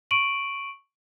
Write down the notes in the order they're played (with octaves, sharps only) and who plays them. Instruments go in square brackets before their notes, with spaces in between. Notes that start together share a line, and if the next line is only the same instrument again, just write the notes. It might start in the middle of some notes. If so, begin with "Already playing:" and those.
[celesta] C#6 D7 D#7 F#7